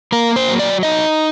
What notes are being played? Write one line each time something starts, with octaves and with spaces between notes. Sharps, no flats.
A#3 A#4
C5
F#3
D5
D#4 D#5